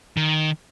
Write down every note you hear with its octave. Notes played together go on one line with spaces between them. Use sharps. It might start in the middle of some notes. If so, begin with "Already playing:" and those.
D#3